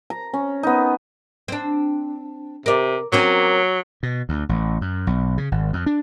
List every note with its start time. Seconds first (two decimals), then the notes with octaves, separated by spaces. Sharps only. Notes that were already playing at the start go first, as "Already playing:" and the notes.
0.10 A#5
0.34 C#4
0.63 B3 D#4
1.48 C4 D4
2.66 C3 A#4 D5
3.12 F#3 A#3 C4 C#4
4.03 B2
4.29 D2
4.49 A1
4.81 F#2
5.07 B1
5.38 C#3
5.52 G#1
5.73 F2
5.86 D4